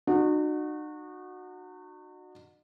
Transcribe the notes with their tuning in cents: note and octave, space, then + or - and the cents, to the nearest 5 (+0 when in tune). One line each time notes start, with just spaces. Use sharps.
D#4 -45 F#4 -15